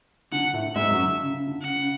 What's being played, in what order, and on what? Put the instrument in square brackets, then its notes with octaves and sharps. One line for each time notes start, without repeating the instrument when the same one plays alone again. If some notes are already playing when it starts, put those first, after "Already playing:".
[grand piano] D3 [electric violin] F#5
[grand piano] A2 A3
[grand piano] G#2 G#3 [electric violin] E5
[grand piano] F#2 F#3
D3
C#3
C#3
D3
[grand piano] C#3 [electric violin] F#5
[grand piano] C#3